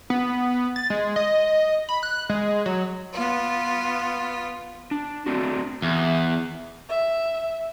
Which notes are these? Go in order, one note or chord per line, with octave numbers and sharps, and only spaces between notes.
B3
A6
G#3
D#5
B5
F#6
G#3
F#3
B3 F4
D4
A3 C4 D4 F#4
E2
E5